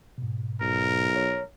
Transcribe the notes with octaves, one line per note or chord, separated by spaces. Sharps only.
G#2 B2
B1 A#4
C#5